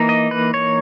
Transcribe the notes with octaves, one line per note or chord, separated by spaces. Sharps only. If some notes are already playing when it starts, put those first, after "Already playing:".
Already playing: E3 A#3 D#4
D#5
B4
C#5